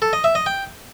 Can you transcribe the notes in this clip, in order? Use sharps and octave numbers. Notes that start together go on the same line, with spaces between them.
A4
D#5
E5
D#5
G5